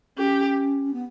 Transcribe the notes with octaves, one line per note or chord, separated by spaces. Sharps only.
C#4 G4
B3